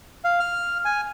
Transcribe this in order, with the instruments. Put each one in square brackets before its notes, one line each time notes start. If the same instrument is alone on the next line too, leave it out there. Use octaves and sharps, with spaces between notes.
[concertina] F5
F6
G#5